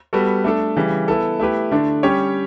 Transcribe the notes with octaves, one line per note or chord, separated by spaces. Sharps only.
G3 B3 F#4 A4
A3 D4 A4
C#3 E3 G3
B3 E4 A4
A3 E4 G4 B4
D3 A3 D4
G3 C#4 G4 C#5